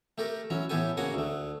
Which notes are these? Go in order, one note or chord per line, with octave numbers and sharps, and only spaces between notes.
A3 G4 A4 A#4
E3 F#3 C#4
A2 E3 B3 G4 A4 G#5
C#3 A#3 F#4 F#5 G#5
D2 A3